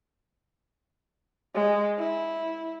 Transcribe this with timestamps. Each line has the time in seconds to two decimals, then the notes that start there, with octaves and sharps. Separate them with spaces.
1.54 G#3
1.98 E4